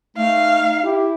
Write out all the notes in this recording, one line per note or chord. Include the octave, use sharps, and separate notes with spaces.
A3 D#4 F5
E4 G4